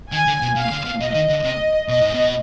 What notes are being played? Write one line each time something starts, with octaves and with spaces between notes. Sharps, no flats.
D#3 G#5
D3
B2
B2 F5
D3
B2
B2 D#5
D#3
D3
C3 D#5
B2 D#5
G#2
B2